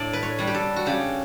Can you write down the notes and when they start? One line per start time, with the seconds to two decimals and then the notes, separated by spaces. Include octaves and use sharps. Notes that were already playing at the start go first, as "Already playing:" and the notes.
Already playing: A2 D4 D5
0.13 B4
0.23 C#5
0.39 G3 D4
0.47 G4
0.54 A4
0.76 F#4
0.86 C#3 G4